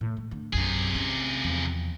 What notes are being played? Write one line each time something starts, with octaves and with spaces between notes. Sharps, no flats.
A2
G#3
D3 A3
A#1 F#2 C3 G#4
C#4
E2 F3